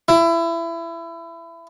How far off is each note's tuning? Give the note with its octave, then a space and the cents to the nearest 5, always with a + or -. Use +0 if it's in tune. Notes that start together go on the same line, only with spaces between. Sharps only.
E4 +25